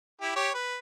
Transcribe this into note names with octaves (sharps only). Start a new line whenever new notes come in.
E4 G4
G4 C#5
B4